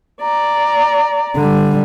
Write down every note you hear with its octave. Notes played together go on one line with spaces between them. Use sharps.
D5 A#5
D3 G3